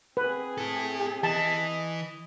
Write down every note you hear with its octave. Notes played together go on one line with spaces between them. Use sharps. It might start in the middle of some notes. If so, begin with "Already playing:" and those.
C4 G#4 B4
E4 A4
E3 D#5 A5